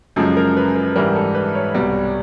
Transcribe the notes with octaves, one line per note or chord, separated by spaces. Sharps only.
F#2 C#3 F3 G#3 A4
A#4
B4
A#4
G#2 E3 G3 A#4
A4
B4
C#5
C2 B2 G3